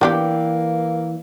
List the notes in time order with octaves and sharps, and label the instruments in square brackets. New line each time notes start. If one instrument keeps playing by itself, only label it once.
[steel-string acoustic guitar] E3 [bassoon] A#3 [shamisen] B3 D4 G4 [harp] D5 G5